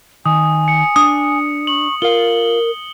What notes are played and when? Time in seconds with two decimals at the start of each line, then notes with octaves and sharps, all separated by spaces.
0.26 D#3 G#5 D#6
0.68 C#7
0.96 D4 D#6
1.67 C#6 F#7
2.02 F4 A#4 F5 G7